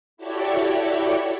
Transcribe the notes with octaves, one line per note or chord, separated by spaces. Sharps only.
E4 F#4 G4 A4 C#5 D5